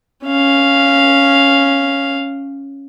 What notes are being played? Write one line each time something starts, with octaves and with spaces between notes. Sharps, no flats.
C#4 F5